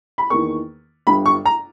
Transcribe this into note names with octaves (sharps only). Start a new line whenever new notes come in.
B5
E2 D#3 A#3 C#6
G1 G2 G3 B5
C#6
A#5